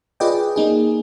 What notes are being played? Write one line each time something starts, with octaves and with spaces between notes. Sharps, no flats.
F4 G#4 B4 D5 D#5 G5
A#3 D#4 G#4